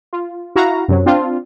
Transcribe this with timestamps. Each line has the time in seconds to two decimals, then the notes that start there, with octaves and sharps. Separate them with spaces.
0.13 F4
0.56 E4 F#4 F5 A#5
0.88 F#2 C3 F#3
1.06 C4 D4 F4